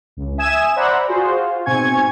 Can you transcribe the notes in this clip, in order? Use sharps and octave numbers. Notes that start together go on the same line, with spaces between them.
C#2
E5 G#5 D#6 G#6 E7
C5 D5 E5 F#5 A#5 B5
F4 F#4 G#4 C5
F4
G#2 B2 C4 G#5 C#6 G#6